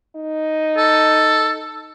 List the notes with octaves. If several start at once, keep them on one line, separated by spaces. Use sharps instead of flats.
D#4
A4